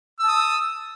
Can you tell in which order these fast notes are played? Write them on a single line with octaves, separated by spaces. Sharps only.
E6 A5 D#6